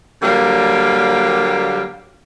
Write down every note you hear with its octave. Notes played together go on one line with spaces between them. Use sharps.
D3 F#3 G3 A#3